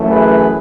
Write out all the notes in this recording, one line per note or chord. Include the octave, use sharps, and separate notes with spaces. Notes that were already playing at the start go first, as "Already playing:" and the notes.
Already playing: F#2 E3 A3
G#4 B4